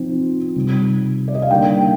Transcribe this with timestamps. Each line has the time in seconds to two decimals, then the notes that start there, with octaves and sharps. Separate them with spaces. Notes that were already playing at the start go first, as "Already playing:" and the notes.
Already playing: F3 C4 D#4
0.56 C3 D#3 G3
1.28 D5
1.35 D#5
1.42 F5
1.51 D3 G3 A#3 D#4 G5